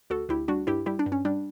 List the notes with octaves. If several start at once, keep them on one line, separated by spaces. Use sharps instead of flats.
D2 F#4 A4
D2 E4 G4
G3 D4 F#4
G2 E4 G4
G3 E4 G4
D4
G2
C#4
G3 D4